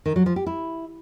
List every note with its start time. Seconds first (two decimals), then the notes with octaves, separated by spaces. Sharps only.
0.06 D#3
0.16 F#3
0.26 F3
0.36 G4
0.46 E4